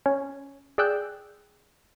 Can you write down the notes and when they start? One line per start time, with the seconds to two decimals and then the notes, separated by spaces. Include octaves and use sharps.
0.06 C#4 C#5
0.78 G#4 D5 G5 E6 F#6 G6